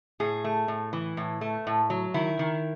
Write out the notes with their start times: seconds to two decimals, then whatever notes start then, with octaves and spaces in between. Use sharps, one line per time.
0.20 A2 G#4
0.44 A3
0.68 A2
0.93 E3
1.17 A2
1.41 A3
1.67 A2
1.90 F#3
2.14 D#3 E4
2.39 D#3